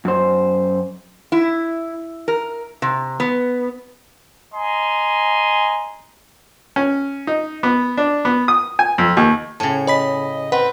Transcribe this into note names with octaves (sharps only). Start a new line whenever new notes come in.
F#2 C5
E4
A#4
C3
B3
D#5 G#5 A#5 C6
C#4
D#4
B3
D4
B3
D#6
G#5
F2
D#2
A2 C#3 A5
C#5 D#5 B5 B6
C4 B4 F#5